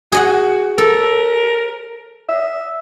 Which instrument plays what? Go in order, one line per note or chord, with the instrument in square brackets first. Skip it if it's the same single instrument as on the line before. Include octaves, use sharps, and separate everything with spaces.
[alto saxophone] F#4 [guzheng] G#4 D#5 F#5
[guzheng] A4 [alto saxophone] A#4
[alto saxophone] E5